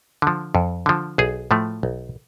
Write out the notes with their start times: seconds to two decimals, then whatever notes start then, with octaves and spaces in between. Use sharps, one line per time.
0.22 D3 F3
0.55 F2
0.86 D3 F3
1.18 B1 G#4
1.51 A2 F3 A3
1.83 B1